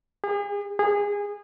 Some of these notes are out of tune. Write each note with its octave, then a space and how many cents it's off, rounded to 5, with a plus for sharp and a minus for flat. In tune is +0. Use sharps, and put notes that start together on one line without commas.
G#4 -40
G#4 -25